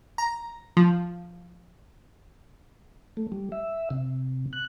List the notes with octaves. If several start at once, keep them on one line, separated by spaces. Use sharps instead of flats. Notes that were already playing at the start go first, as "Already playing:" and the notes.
A#5
F3
A3
G3
E5
C3
F#6